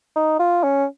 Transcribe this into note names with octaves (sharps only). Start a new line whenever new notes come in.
D#4
F4
C#4